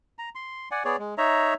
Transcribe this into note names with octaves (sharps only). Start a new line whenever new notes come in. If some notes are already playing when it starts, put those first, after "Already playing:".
A#5
C6
D5 F#5 G#5
B3 G#4 C#5 D5
G#3
D#4 C#5 E5 A#5